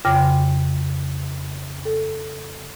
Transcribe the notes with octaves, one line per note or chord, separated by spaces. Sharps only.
F2 C#3 G5 D6 F6 A#6
A4